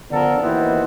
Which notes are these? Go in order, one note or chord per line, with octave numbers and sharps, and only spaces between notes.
D3 F3 B3 D4 A4 A#4
D#2 B2 D#3 E3 B3 C4